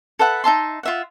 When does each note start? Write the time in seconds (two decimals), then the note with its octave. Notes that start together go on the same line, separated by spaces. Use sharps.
0.19 A4 B4 E5 F#5
0.44 D#4 E5 A5 C6
0.83 F4 E5 F#5